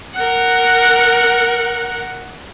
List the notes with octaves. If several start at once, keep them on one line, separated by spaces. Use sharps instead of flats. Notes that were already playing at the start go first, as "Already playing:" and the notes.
A#4 F#5